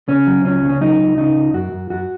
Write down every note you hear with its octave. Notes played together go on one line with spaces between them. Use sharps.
C#3 C#4
F#3
C#2 C#4
C#3
C#4
F#3 D#4
C#2
C#3 D#4
C#2
F#2 F#4
F#2
F#2 F#4